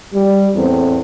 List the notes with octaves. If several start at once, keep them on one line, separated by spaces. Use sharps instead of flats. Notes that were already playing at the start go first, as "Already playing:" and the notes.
G3
E2 A2 C4